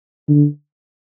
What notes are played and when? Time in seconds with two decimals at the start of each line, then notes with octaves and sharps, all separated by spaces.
0.28 D3